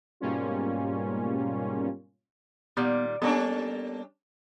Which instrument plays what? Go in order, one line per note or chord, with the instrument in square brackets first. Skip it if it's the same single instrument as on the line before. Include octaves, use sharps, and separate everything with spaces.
[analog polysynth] G#2 B2 G3 A#3 C#4 F4
[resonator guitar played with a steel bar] A#2 D#3 G3 [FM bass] B3
[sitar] G3 C#4 D4 [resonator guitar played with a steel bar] A#3 A4 [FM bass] B3